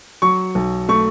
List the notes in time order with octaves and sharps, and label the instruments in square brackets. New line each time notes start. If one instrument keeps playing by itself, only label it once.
[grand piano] F#3 C#6
B1
A3 C#6